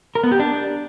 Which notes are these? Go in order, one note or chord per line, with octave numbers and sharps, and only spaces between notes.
A#4
B3
G4
D4